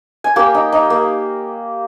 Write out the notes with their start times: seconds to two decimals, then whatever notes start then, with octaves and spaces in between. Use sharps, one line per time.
0.24 G#5
0.36 A#3 G4 G5
0.54 D#4
0.72 D#4
0.90 A#3